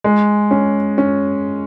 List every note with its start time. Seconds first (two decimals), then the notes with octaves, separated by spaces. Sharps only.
0.04 G#3
0.51 C#4
0.98 C#4